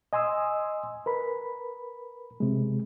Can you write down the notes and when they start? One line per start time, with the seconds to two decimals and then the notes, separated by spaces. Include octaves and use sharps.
0.13 D#5 G#5 C6 D#6 E6
1.06 A#4 B4 B5
2.40 C3 G#3